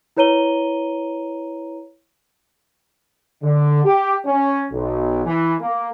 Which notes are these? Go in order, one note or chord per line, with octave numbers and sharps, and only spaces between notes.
E4 B4 C#5 A#5 D#7 G7
D3
G4
C#4
B1
E3
A#3